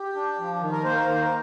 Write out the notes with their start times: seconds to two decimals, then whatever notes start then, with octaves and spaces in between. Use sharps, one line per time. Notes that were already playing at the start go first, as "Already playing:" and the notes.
Already playing: G4
0.15 D4
0.38 F3
0.60 D#3
0.72 A#4
0.84 A#3 C5
0.95 A#4
1.06 D#3 C5
1.21 A#4